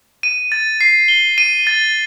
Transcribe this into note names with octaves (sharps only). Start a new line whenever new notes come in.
D#7
A6
C7
G7
D#7
A6